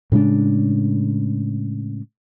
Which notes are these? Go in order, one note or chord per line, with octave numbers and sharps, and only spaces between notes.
A2 C#3 G#3 D4